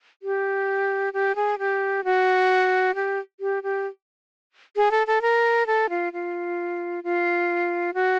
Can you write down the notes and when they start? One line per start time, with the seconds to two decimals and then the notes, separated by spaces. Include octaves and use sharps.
0.23 G4
1.13 G4
1.36 G#4
1.59 G4
2.04 F#4
2.95 G4
3.40 G4
3.63 G4
4.76 G#4
4.91 A4
5.07 A4
5.22 A#4
5.67 A4
5.90 F4
6.13 F4
7.04 F4
7.94 F#4